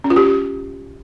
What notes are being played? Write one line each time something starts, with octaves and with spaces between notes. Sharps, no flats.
C#4
F4
G4